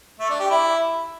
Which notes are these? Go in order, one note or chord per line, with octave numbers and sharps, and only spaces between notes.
A3
D4
G4
E4